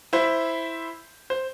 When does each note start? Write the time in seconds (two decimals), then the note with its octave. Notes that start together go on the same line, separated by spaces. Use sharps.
0.13 E4 C5
1.30 C5